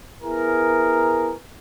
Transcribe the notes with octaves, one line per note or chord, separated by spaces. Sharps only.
B3 E4 G#4 A#4